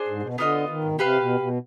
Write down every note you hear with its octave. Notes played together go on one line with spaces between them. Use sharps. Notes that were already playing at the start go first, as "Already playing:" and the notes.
Already playing: D4 G#4 C5
G#2
B2
D3 B3 F4 B4 D#5
D#3
G#2
B2
C3 G4 B4 F5
B2
B2